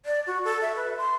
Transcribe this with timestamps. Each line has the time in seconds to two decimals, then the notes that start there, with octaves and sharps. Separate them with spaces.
0.06 D5
0.27 F#4
0.45 A4
0.62 E5
0.76 B4
0.97 C6